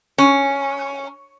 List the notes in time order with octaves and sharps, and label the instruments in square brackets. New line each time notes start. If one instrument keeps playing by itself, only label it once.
[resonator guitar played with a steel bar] C#4